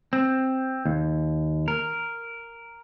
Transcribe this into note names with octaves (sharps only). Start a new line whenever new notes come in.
C4
D#2
A#4